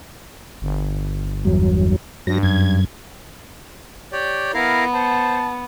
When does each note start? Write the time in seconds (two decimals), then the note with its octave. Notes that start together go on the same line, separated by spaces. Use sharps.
0.62 G1
1.45 E2 G2 F#3
2.27 G2 F#3 A#6
2.43 F#2 G#6
4.12 G4 C#5 D5
4.54 B3 E4 A#4 F5
4.94 C5 A5